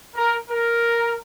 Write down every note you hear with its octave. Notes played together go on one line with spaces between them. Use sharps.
A#4
A#4